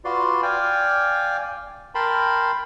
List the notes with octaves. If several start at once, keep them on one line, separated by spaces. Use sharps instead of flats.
F4 F#4 B4 D5 C6
D5 F5 G5 G#5
A#4 G5 A5 B5 C6